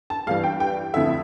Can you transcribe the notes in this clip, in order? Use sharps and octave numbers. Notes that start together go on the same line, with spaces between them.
A5
G2 E3 G3 F5
G5
G5
F2 D3 A3 E4 E5